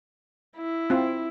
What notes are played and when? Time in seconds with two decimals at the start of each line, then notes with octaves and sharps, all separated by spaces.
0.57 E4
0.90 C4 F4